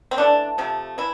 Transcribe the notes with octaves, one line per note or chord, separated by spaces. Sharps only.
C4
E3 A3 D4
C3 F3 A3
E3 E4